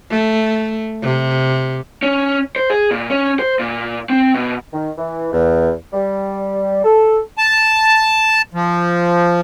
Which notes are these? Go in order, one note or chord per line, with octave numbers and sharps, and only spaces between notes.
A3
C3
C#4
C5
G#4
A#2
C#4
C5
A#2
C4
B2
D#3
E3
E2
G3
A4
A5
F3